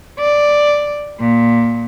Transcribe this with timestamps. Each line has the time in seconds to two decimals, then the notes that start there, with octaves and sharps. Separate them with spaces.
0.20 D5
1.20 A#2